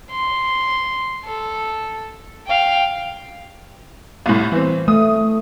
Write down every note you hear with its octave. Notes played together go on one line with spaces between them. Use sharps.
C6
A4
F5 G5
C2 A2
E3 C4
A3 D#6